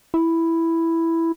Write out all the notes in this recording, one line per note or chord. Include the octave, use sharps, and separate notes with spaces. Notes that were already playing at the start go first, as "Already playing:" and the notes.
E4